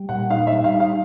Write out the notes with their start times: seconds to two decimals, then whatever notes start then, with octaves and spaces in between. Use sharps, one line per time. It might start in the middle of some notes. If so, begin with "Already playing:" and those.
Already playing: G3
0.09 A#2 F#5
0.30 D#4 F5
0.47 E5
0.52 G3
0.64 F5
0.74 D#4
0.80 F5